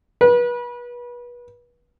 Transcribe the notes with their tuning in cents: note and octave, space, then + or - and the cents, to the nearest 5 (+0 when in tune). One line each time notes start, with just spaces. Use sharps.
B4 -30